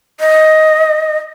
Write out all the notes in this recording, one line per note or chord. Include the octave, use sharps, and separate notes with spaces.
D#5